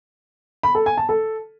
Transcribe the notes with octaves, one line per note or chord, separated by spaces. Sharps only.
B5
A4
G#5
A5
A4